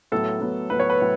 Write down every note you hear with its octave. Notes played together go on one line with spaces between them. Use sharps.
A2 F#3 B3 A4
A2 F#3 B3
A2 F#3 B3 B4
C#5
B4
A2 F#3 B3